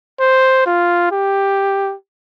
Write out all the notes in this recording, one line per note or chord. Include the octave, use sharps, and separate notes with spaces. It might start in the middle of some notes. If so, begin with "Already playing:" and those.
C5
F4
G4